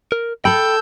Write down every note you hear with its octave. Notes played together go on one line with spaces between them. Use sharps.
A#4
A4 G5 A5 B5 E6 G6